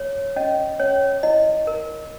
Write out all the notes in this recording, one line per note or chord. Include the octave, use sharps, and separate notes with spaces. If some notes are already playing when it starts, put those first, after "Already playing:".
Already playing: C#5
C#4 D#5
C#4 C#5
E4 D#5
A#4